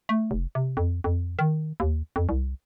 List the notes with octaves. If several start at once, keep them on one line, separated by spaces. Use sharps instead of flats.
A3
F1
C3
F2
F2
D#3
D#2
F2
C2